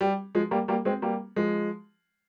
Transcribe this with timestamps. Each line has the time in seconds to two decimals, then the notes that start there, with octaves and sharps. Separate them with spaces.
0.01 G3
0.35 F3 G#3
0.51 G3 A#3
0.68 G3 A#3
0.85 G#3 C4
1.02 G3 A#3
1.36 F3 G#3